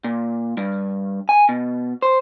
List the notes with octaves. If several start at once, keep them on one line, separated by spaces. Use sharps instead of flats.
A#2
G2
G#5
B2
C5